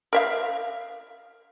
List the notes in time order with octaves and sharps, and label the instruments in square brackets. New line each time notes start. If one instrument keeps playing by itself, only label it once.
[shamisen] A#4 E5 F5